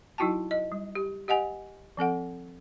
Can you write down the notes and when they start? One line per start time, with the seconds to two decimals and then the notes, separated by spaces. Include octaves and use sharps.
0.18 F#3 D#4 E4 F#4 G5 A5
0.51 D#5
0.72 G3
0.95 G4
1.28 G4 D#5 F#5 G#5
1.97 F3 C4 A4 F#5